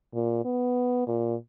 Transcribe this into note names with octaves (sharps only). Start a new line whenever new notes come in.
A#2
B3
A#2